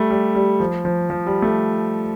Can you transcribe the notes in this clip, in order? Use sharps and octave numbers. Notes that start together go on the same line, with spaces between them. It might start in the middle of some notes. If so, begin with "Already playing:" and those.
Already playing: G3 A3
G3
G3
F3
F3
F3
G3
A3